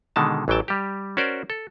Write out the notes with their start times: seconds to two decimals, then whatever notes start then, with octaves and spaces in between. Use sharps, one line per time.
0.16 B2 D3 D#3 G#3 A5
0.48 A1 E3 F#3 G5 A5
0.68 G3 G4
1.17 C#4 F#4 A#4 C5 D5
1.50 A4